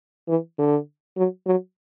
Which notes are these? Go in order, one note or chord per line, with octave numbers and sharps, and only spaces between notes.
E3
D3
F#3
F#3